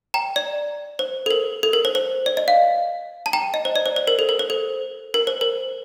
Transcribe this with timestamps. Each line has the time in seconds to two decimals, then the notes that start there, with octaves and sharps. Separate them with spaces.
0.14 G5 A#5
0.36 D5
0.99 C5
1.26 A4
1.31 A#4
1.63 A4
1.73 A#4
1.85 C5
1.95 C5
2.26 D5
2.37 D#5
2.48 F5
3.26 A5
3.33 G5 A#5
3.54 D#5
3.65 C5
3.76 D5
3.86 C5
3.96 C5
4.07 A#4
4.19 A4
4.29 A#4
4.39 C5
4.50 A4
5.14 A#4
5.27 C5
5.41 A#4